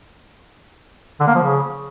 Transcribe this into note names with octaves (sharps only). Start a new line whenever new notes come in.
D3
A#3
F3
C#3